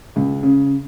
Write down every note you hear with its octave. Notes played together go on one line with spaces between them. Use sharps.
C#2
C#3